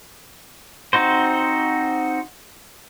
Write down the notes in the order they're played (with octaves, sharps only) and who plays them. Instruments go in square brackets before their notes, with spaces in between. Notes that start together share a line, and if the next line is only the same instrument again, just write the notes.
[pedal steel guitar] C4 D#4 F#4 C5